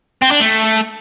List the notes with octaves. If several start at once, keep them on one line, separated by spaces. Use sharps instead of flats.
C4
D4
A3